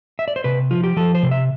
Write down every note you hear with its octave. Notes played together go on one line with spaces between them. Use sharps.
E5
D5
C5
C3 B4
F3 F4
G4
F3 A4
C5
C3
E5